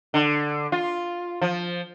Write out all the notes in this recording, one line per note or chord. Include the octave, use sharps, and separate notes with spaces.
D3
F4
F3